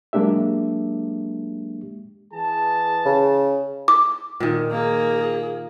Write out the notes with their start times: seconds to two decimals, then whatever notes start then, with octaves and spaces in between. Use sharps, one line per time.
0.13 F#3 G#3 A#3 D4 G4 E5
2.33 E3 G#4 A5
3.06 C#3
3.88 D6
4.40 A#2 D#3
4.71 A#3 G#4